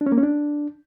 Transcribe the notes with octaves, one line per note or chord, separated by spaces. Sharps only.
D4
C#4
A#3
C#4
D4